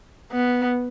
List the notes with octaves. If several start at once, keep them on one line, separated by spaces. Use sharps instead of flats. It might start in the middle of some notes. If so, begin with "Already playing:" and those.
B3